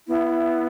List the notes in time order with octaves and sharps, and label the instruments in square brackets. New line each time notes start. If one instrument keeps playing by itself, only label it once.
[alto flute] B3 [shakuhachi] E4